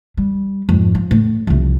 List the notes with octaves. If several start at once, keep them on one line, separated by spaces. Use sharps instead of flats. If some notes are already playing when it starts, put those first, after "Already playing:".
G3
F2 G#2
F3
A2
C2 F2